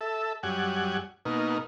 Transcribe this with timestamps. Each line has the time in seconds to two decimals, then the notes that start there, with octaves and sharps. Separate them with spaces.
0.01 A4 E5
0.43 F#2 G3 F#5 G#5
1.25 B2 A#3 D#4